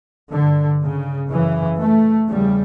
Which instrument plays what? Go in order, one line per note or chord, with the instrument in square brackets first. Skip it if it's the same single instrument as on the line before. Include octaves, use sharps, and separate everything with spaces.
[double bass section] G2 D3
C#3
F#2 C#3 E3
A3
E2 C#3 G3